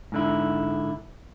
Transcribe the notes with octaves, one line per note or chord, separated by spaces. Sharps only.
G#2 D3 E4